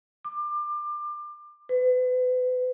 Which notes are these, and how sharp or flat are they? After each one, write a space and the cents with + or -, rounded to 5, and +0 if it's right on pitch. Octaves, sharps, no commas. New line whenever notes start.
D6 +25
B4 +35